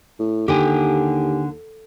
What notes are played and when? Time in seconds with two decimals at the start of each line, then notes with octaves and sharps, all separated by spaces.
0.19 A2
0.48 D#2 D3 G4 G5 G#5